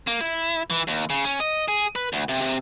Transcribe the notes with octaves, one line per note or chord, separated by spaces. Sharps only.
A#3
E4
E3
D#2
C#3
C#4
D#5
G#4
B4
D2
C3
C3